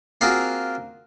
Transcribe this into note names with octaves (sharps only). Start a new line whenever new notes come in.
A#3 C4 F4 F#4 G#4 A#4